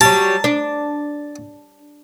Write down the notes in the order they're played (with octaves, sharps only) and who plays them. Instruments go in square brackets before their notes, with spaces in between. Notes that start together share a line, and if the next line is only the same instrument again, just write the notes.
[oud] F#3 G3 [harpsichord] A5
[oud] D4